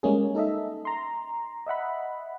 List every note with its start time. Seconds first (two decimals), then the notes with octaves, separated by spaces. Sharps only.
0.03 G3 G#3 A#3 C#4 G#4
0.35 D#4 A4 D#5 E5
0.85 A#5 C6
1.66 D#5 E5 F#5 B5